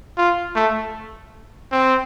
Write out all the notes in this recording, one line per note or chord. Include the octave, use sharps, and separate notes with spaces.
F4
A3
C4